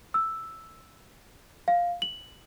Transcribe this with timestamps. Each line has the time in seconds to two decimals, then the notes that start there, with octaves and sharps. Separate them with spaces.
0.14 E6
1.68 F5
2.02 F#7